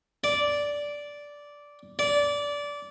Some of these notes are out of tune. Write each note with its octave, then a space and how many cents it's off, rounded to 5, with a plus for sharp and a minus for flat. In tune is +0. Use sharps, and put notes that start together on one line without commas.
D5 -10
D5 -20